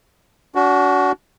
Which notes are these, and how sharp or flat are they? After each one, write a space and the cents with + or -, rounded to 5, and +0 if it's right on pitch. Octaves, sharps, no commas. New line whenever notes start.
D4 -40 F#4 +10